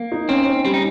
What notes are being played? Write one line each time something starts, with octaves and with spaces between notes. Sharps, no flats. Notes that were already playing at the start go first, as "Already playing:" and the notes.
Already playing: A#3
D#4
C4 C#4
C#4
G3 C4
D#4